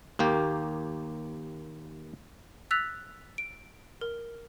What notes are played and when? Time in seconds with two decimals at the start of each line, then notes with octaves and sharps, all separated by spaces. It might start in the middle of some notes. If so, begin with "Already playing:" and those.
0.19 D#2 A#3 G4
2.71 E6 F#6 A6 B6 F7
3.38 D7
4.01 A#4